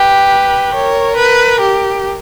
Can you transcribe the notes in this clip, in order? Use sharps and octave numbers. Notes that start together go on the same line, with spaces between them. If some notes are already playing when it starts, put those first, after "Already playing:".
Already playing: G4 B4
A#4 C#5
B4
G4